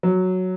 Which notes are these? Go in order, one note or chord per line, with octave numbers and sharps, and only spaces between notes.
F#3